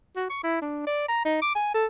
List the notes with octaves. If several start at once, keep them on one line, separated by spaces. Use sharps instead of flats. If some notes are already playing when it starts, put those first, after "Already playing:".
F#4
C#6
E4
D4
D5
A#5
D#4
D6
G#5
A4